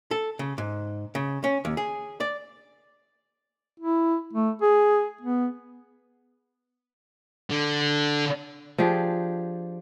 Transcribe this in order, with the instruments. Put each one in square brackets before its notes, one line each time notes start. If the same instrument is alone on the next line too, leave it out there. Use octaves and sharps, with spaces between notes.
[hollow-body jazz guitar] A4
C#3
G#2
C#3
C#4
D#2
G#4
D5
[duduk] E4
A3
G#4
B3
[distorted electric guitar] D3
[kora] F3 D4 G4 G#4